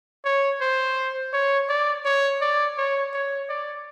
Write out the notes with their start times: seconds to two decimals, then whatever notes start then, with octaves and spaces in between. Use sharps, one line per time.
0.25 C#5
0.61 C5
1.33 C#5
1.69 D5
2.05 C#5
2.41 D5
2.78 C#5
3.13 C#5
3.49 D5